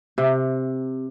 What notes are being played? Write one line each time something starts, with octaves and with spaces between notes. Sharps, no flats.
C3